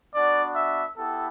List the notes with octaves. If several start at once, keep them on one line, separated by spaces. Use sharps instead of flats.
B3 D4 F#4 D5
E5
B3 E4 G4 A4